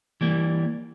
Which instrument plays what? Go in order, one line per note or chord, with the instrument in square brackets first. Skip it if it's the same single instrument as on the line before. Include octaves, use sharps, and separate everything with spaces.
[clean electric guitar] E3 G3 A#3